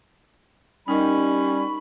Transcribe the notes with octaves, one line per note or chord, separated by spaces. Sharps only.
G3 C#4 D#4 A#4 D#5 B5 C#6